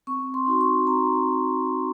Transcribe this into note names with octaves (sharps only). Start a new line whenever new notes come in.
C4 C#6
C6
D#4 F#4
C#6
C4 A#5